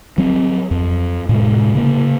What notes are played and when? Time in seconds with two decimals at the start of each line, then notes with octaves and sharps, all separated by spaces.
0.18 F#3 C4
0.71 F2
1.29 A2 C3 G#3
1.75 C#3 A#3